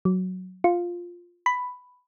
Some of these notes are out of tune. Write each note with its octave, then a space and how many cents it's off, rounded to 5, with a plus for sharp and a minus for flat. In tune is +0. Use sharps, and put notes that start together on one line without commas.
F#3 +0
F4 +5
B5 +10